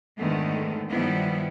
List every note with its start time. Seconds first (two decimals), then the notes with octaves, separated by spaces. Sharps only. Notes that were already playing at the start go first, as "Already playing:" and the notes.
0.18 F2 G#2 D3 D#3 A3 B3
0.89 G2 D#3 F3 G3 B3 E4